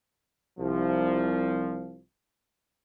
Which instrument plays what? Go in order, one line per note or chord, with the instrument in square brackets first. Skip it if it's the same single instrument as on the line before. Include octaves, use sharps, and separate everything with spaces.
[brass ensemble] C2 F3